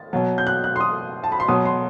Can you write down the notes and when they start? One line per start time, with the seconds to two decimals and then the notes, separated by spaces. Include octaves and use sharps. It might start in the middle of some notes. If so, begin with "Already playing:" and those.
Already playing: A6
0.13 B2 F#3
0.38 G6
0.47 F#6
0.64 F#6
0.76 C6
0.81 D#6
1.24 A5
1.32 B5
1.40 C6
1.48 B2 F#3 D#6
1.65 C6